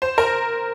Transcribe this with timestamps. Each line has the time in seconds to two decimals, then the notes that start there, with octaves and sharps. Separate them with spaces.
0.02 C5
0.18 A#4